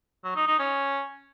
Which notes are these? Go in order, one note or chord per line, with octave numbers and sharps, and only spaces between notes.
F#3
D#4
D#4
C#4